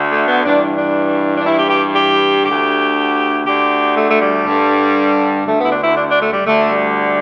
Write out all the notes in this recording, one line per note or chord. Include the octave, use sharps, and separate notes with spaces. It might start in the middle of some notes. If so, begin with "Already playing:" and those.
Already playing: D2 D3
A3
B3
G2 E3 D4
D4
D4
G2 E3 E4
G4
G4
G4
D2 D3 G4
D2 D3 G4
A3
A3
G3
G2 D3
D2 D3 A3
B3
E4
D4
E4
D4
D4
A3
G3
D2 D3 A3
G3